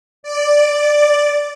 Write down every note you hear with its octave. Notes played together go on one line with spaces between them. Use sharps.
D5